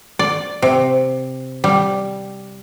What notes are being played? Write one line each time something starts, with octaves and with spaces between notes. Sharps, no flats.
D5
C3
G3